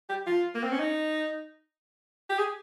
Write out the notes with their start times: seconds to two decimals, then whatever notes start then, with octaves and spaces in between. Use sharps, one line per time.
0.09 G4
0.27 F4
0.55 A#3
0.63 C4
0.71 C#4
0.80 D#4
2.30 G4
2.38 G#4